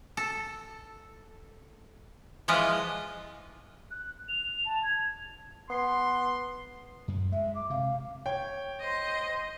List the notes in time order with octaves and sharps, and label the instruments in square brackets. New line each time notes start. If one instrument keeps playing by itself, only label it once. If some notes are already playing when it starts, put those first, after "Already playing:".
[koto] A4
E3 F3 G#3 F4 B4 D#5
[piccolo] F#6
F7
A5
G#6
[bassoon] B3 [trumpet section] C6
[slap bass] F#2
[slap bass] G#3 [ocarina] E5
[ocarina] D6
[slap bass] C3 [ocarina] F5
[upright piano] C#5 G5
[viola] C5 D#5